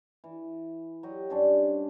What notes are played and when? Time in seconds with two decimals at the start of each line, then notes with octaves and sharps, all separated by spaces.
0.24 E3
1.03 F#3 G4 D#5
1.30 G2 C#4 D4 C6